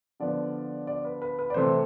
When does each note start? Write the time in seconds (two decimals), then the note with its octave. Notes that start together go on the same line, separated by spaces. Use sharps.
0.20 D3 F3 B3 D5
0.87 D5
1.05 B4
1.22 B4
1.39 B4
1.50 D5
1.54 C3 E3 A3 C4 C5